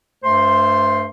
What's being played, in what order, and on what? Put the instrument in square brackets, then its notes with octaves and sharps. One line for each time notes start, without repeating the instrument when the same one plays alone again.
[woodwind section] G2 A3 C5 C6